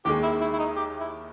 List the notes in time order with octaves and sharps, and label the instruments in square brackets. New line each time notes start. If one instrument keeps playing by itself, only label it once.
[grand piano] D#2 D#3 G#3 [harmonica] G4
[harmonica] E4
E4
E4
D#4
G4
E4